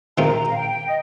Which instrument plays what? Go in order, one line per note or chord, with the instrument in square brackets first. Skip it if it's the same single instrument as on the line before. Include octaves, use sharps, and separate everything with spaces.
[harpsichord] D#3 G#3 C4 F4 C5 [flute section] A#5
[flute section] F5
G5
D#5